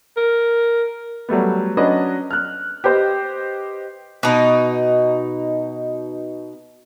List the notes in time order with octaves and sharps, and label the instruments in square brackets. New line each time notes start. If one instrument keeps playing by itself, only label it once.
[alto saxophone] A#4
[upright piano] F#3 G3 A3 B3
F#3 C#4 D4 B4 D#5
F6 F#6
G4 B4 C5 D#5
[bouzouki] B2 D#4